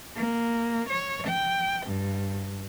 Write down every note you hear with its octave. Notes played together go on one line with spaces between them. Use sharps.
A#3
C#5
G5
G2